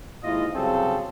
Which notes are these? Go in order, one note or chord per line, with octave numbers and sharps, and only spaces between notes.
D#2 G#2 E4 F4 D#5
C2 C#3 F#3 C4 A4 C5